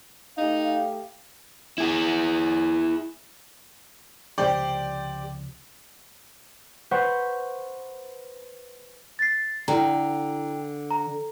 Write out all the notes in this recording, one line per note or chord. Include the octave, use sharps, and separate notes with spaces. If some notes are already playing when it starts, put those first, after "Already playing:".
A3 D#4 G4 F5
E4 G#4
C#2 C3 F3 G4 C5 D5 G5
B4 C5 F#5 C#6
A6 C7
D3 E4 G5 A#5
A#5